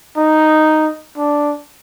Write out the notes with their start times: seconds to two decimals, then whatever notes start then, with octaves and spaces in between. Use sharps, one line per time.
0.17 D#4
1.17 D4